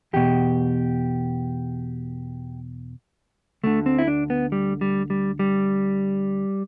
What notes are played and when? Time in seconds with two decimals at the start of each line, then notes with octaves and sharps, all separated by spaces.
0.13 E2 B2 G4
3.64 D2 D3 A3
3.86 C4
3.99 E4
4.08 D4
4.30 B3
4.52 G3
4.81 G3
5.10 G3
5.39 G3